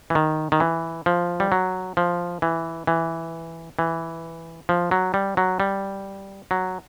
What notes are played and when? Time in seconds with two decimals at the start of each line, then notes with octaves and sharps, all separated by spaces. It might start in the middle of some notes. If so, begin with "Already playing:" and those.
0.10 E3
0.15 D#3
0.52 D#3
0.60 E3
1.06 F3
1.40 G3
1.52 F#3
1.97 F3
2.42 E3
2.87 E3
3.79 E3
4.69 F3
4.91 F#3
5.14 G3
5.37 F#3
5.60 G3
6.51 F#3